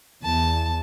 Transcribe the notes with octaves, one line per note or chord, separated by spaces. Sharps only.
E2 A5